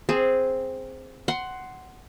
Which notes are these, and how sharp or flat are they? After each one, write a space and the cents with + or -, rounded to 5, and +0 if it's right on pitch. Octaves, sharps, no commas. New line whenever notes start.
C4 +0 G#4 +0
F#5 +10 C6 +0